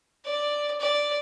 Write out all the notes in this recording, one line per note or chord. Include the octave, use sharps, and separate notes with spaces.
D5
D5